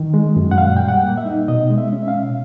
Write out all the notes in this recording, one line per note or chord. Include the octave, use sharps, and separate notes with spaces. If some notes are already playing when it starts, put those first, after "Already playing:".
Already playing: D#3
G#3
F#2
F#5
A#2 F5
G3 G5
F#5
A#3
E5
D#4
B2 D#5
G#3
E5
C#4
E5
F5
B2